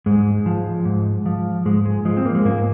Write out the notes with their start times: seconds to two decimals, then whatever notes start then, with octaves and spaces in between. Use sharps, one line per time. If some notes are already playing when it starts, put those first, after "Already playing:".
0.06 G#2 G#3
0.46 F3
0.85 G#2
1.26 F3
1.65 G#2 G#3
1.86 G#3
2.05 F3 G#3
2.17 C4
2.26 A#3
2.35 G#3
2.45 G#2 A#3